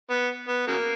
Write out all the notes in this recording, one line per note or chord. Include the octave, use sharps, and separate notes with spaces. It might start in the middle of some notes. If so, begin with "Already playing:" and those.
B3
B3
C#3 F#3 A#3